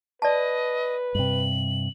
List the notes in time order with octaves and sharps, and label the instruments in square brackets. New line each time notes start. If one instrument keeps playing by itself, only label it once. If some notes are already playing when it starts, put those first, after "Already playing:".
[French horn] B4 [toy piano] D5 A5 [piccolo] D#5
[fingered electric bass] G2 C3 [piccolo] F#7